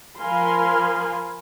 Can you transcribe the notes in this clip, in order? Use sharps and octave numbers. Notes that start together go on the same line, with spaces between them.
F3 A#4 F5 G#5 B5 C6